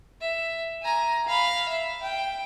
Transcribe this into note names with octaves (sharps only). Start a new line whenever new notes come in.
E5
G#5 A#5
F5 B5
E5
G5